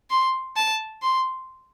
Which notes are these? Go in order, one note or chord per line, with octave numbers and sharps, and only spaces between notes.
C6
A5
C6